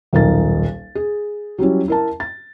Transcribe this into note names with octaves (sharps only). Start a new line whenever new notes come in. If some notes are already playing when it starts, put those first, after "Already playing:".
D#1 B1 D#4 A#4 A6
G#4
F#3 G3 C#4 E4
E4 A#4 A5
A6